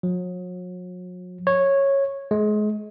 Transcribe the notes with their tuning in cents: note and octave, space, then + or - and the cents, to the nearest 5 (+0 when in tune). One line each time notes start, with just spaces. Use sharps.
F#3 -40
C#5 -10
G#3 +30